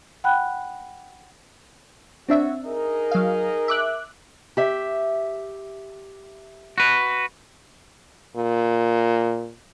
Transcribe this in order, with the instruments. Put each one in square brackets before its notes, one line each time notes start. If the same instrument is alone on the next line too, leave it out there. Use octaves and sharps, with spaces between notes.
[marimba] F#5 G5 B5 F#6
[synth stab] C4 D4 E5 [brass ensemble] F#4 C#5
[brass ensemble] D#4 G#4 A#4
[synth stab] F#3 F5
E5 D6 F#6
[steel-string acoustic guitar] G4 E5
[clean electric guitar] F#4 B4
[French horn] A#2